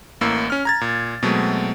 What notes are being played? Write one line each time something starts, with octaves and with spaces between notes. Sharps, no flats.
A1 A2 A#3 E6
C#4 F6
A#5 G#6 A6
A#2
B2 F#3 G#3 A3 C4